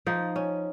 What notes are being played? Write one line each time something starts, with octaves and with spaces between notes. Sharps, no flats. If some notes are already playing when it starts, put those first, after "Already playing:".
F3 D#4
C#4